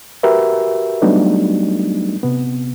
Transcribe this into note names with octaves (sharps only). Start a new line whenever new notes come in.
F#4 G4 A#4 B4 E5
F#3 G3 A3 B3 D4 D#4
C3 B3